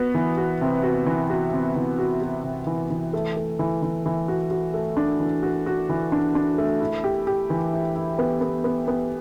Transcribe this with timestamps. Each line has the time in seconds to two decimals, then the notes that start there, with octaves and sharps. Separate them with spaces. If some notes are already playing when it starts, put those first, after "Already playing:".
Already playing: B3 F#4
0.15 E3
0.38 F#4
0.61 C3
0.83 F#4
1.07 E3
1.30 F#4
1.53 C3
1.76 E3
1.99 F#4
2.22 F#4
2.44 C3
2.67 E3
2.90 E3
3.13 A3
3.36 A3
3.59 E3
3.82 E3
4.06 E3
4.28 F#4
4.51 F#4
4.74 A3
4.97 D4
5.20 E3
5.43 F#4
5.66 F#4
5.89 E3
6.12 D4
6.35 D4
6.58 A3
6.80 E4
7.04 G4
7.27 G4
7.50 E3
7.73 E4
7.95 E4
8.18 B3
8.41 B3
8.64 B3
8.88 B3